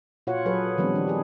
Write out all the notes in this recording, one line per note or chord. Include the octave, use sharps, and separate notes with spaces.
A#2 F4 F#4 C#5 F#5
F#3 G#4 A4 B4 C#5
D#3 F3 G3 B3 C4 D4
D4
D#4 G#4